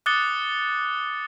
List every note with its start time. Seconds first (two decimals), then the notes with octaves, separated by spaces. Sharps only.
0.06 D6 D#6 F#6 A6 C#7 G7